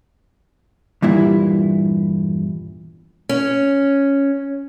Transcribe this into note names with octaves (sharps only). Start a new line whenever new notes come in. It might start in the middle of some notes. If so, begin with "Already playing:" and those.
E2 G2 A#2 E4
C#4